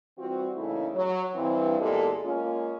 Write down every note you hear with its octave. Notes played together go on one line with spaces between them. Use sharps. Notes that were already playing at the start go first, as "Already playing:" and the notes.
E3 G3 C4 F4 F#4
A#2 C#3 E3 A3 D#4 E4
F#3
G2 E3 C4
E2 A#2 G#3 G4 A4
G#3 A#3 C#4 F4